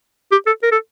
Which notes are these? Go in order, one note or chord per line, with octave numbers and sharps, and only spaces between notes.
G4
A4
A#4
A4